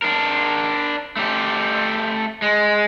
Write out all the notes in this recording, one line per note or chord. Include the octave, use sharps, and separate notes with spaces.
D4 A#4
A3 G4
G#3